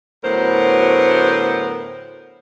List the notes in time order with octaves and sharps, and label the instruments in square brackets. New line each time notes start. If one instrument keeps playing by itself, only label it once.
[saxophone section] D2 A2 F#3 B3 A#4 C5